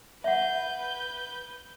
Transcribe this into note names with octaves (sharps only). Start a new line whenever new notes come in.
B4 E5 F#5 G6